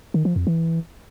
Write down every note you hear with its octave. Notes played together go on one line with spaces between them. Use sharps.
D#3
F3
F2
E3